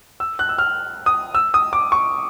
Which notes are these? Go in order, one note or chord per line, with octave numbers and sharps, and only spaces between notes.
E6
F#6
E6
F6
D#6
E6
D#6
D6
C#6